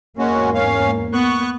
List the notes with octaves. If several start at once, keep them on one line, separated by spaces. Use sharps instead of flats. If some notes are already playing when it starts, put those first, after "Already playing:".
E2 G#2 G#3 A#3 C#4 F#4
C#4 F5
B3 C#6 F#6